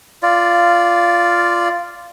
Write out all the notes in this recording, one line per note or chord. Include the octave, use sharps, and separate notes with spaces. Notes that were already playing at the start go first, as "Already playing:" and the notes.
F4 D5